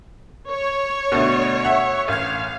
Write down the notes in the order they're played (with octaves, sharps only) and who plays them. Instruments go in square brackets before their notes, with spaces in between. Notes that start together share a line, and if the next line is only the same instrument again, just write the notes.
[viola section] C#5
[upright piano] B2 D3 A3
E5 F#5
[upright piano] A1 G#6 [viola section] F5